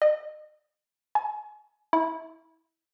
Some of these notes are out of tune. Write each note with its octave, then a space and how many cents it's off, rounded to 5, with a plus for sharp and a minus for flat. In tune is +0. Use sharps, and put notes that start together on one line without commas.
D#5 -35
G#5 +30
E4 -20